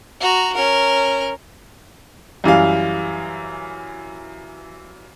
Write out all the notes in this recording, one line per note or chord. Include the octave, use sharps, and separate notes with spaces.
F#4 A#5
C#4 A#4
F#2 E3 G3 F5